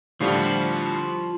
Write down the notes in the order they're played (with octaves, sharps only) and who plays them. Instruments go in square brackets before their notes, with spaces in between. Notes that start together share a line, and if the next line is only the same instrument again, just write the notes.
[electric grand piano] A2 D3 G3 [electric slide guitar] F3 F4